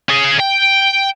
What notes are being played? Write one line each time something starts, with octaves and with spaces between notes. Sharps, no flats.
C#4 G#4
G5